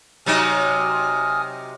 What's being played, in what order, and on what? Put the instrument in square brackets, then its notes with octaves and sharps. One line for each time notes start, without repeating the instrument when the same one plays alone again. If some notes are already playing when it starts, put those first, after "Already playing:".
[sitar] C3 F#3 D#4 [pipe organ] G#5 D#6 F6